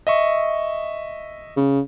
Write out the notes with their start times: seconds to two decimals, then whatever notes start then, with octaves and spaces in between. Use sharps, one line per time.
0.07 D#5 E5 C#6
1.57 C#3